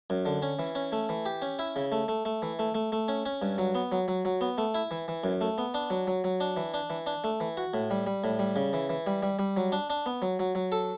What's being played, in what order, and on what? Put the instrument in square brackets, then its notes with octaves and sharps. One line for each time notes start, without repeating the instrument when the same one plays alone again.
[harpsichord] F#2
D3
C#4
E3
C#4
A3
E3
G4
C#4
E4
C#3
A3
A3
A3
E3
A3
A3
A3
C#4
C#4
G2
F#3
B3
F#3
F#3
F#3
B3
A3
E4
E3
E3
F#2
A3
B3
D4
F#3
F#3
F#3
D4
E3
D4
E3
D4
A3
E3
F#4
A2
G3
G3
A2
G3
C#3
E3
E3
G3
G3
G3
F#3
D4
D4
B3
F#3
F#3
F#3
A4